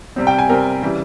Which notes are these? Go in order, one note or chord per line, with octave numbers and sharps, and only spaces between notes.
C3 G3 C4
G5
G#5
C3 G3 C4 A#4
C#3 E3 G3